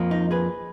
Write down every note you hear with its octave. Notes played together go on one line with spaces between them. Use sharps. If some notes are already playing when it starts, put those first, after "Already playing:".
Already playing: F2 F3 A#3
D#4
G#4 B4